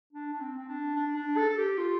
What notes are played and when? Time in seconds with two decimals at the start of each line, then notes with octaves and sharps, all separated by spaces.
0.13 D4
0.33 D4
0.41 C4
0.58 C4
0.68 D4
0.96 D4
1.16 D4
1.37 A4
1.49 A4
1.57 G4
1.78 F4